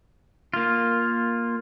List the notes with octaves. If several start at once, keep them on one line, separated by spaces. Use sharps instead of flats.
A#3 F4